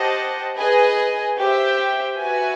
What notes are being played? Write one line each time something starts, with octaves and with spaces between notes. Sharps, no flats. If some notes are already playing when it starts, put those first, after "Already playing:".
Already playing: G4 C5 D#5 F#5 A5
G#4 B4 D#5 G#5
G4 C5 E5 G5
F#4 B4 E5 G#5